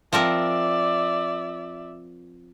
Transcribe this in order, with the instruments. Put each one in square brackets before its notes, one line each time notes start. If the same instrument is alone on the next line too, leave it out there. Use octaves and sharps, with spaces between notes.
[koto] F3 C4 A#4 [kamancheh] D5 E5